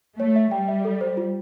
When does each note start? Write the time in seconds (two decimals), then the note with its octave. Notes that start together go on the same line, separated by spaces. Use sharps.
0.20 A3 C#5
0.36 E5
0.51 G3 G5
0.68 E5
0.85 A4
1.01 C5
1.17 F4